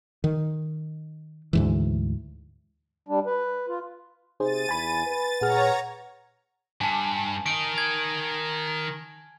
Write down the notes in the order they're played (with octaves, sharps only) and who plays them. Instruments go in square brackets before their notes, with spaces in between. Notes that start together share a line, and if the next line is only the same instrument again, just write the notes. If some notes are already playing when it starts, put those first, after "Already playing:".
[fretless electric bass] D#3
D2 G#2 E3
[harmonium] G3 D4
B4
F4
[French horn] C3 [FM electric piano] D#4 G#4 C5 [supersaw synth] A6 D#7
[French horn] E2 [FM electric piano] G#5 B5
[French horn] B4 [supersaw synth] A6
[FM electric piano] A#2 G#4 F6 [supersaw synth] C#5 A#5 [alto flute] F#5
[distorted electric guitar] G2 [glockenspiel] G#5 A5
[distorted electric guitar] D#3 D#4 [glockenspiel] D7
[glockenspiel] G#6